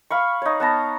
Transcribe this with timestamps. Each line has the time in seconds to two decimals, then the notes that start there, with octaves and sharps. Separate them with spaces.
0.10 F5 B5 C#6
0.42 D#4 C#5
0.60 B3 A5 A#5